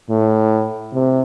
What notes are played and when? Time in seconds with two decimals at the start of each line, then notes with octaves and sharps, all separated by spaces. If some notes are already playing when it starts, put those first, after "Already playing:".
0.10 A2
0.93 C3